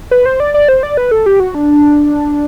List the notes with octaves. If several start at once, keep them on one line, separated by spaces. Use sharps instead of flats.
B4
C5
D5
D5
C5
D5
B4
A4
G4
F#4
D4